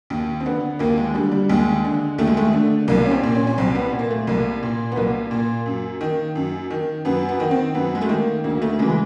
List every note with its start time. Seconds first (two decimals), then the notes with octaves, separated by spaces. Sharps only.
0.10 D#2
0.40 C4
0.46 D3 B3
0.79 D#2 A#3
0.98 G#3
1.14 D3 G3
1.31 G3
1.49 D#2 G#3
1.84 D3
2.18 D#2 A3
2.27 G#3
2.37 A3
2.53 D3
2.88 C2 A#3
3.06 C#4
3.11 C4
3.23 A#2
3.35 C#4
3.47 C#4
3.58 C2 C4
3.75 B3
3.93 A#2
3.99 A#3
4.10 A3
4.27 C2 A#3
4.63 A#2
4.92 B3
4.96 C2 A#3
5.31 A#2
5.66 F#2
6.01 D#3
6.36 F#2
6.70 D#3
7.05 F#2 B3
7.29 B3
7.40 D#3
7.51 C4
7.74 F#2 B3
7.95 G#3
8.02 A3
8.09 D#3 A#3
8.44 D2 A#3
8.62 A3
8.79 C#3 G#3
8.82 E3
8.90 G#3